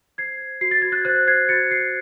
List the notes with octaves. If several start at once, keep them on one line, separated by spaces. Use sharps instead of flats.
C5 G#6 C7
C5
F#4 C7
A6
F#4 G#6
F#6 A6
C5 F#6 A6
C5 G#6 C7
F#4 A6 C#7
F#4 G#6 C7